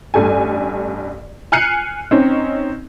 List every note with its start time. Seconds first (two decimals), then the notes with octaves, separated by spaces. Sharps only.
0.14 A1 G2 A4 G#5
1.52 G#5 F6 F#6 C7 C#7 D#7
2.11 C4 C#4 D#4